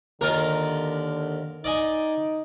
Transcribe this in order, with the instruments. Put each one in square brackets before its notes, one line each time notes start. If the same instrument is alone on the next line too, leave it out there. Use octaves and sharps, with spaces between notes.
[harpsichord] D#2 F4 [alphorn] D3 [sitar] A#4
[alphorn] D#4 [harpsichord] D5 D#5 G#5